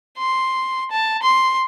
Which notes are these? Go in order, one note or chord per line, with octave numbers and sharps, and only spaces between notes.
C6
A5
C6